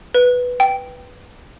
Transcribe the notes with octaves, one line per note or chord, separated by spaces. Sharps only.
B4
G5